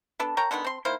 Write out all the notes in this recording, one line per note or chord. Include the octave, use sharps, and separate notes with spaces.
B3 D4 A4
A#4 C#5 G5 A#5
D3 D#3 G#3 B3
C4 C6
D#3 A#3 E4 C5